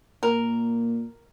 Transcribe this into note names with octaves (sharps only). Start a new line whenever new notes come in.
A#2 A#4